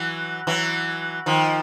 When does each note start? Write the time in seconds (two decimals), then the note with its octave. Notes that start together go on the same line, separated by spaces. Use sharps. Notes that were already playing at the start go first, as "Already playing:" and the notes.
Already playing: E3 F#3
0.47 E3 F#3
1.26 D#3 F3